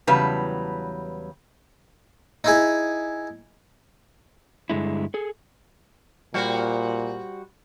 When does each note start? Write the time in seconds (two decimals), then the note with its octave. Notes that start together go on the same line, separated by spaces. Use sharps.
0.07 E2 C#3 F#3 G3 B4 A5
2.44 D#4 E4 G#4
4.70 G2 D3 G#3 E4
5.14 G#4 A4
6.34 A#2 G3 F#4 C5